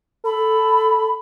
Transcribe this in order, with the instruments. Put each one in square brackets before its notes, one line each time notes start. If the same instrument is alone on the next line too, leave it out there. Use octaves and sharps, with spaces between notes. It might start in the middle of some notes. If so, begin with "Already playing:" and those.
[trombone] A4 [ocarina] B5